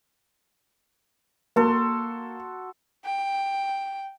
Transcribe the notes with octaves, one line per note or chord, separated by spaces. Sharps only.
A#3 F#4 A4 C6
G5